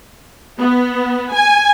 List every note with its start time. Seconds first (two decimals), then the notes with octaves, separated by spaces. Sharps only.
0.59 B3
1.32 G#5